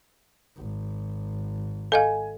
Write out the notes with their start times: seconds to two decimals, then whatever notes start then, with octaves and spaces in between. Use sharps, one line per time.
0.57 G#1
1.92 A4 D#5 F5 G#5